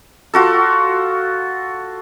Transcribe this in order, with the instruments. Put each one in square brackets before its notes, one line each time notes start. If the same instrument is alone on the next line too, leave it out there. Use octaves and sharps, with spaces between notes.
[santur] F4 F#4 A4